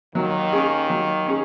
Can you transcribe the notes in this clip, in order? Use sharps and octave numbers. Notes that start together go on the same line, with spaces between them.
D#2 D#3 F#3
C#4 G#4
F#3
C#4 G#4